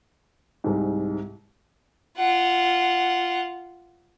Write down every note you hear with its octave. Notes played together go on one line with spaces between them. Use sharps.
C2 G#2
F4 F#5